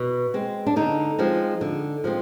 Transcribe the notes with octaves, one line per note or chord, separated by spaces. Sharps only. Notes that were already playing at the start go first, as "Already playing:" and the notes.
Already playing: B2
G#3 C4
D4
D3 D#4
F3 G#3 C4
D3
F3 G#3 C4